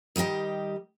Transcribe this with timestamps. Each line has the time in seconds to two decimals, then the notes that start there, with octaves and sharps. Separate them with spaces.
0.16 D#3 G3 G4 D#5 G5